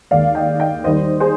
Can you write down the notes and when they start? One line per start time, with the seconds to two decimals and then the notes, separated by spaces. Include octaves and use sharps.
0.11 D#2 D#3 G#3 D5 F5
0.35 D#5 G5
0.60 D#5 G5
0.84 D#2 D#3 G3 C5 D#5
1.20 G#4 C5